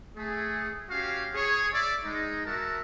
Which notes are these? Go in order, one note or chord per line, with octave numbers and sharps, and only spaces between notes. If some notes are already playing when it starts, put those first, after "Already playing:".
A3 G#4
C#4 F#4 G4 F5
G#4 C#5
D5 E5
G#3 D#4
F#4 A#4 E5 A5